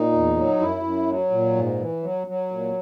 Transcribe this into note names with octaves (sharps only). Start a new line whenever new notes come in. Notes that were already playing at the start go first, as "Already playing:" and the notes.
Already playing: A#2 D#4
E2
F#3
F#2 E4
F#2
F#3
A#2
G#2
E3
F#3
F#3
A#2